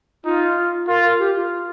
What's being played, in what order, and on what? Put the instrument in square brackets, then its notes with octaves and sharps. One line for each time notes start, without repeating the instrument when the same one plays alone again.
[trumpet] D#4 [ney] F4
[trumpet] F4 [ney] A#4
[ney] A#4
G4
F4